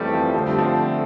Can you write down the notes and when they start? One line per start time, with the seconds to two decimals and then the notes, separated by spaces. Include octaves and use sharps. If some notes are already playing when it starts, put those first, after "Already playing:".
Already playing: F2 C3 E3 G3 A3
0.13 F3
0.33 D3 F3 A3 C4
0.46 G3
0.58 F3